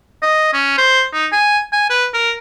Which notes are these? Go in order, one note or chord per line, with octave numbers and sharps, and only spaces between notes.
D#5
C#4
C5
D#4
G#5
G#5
B4
A#4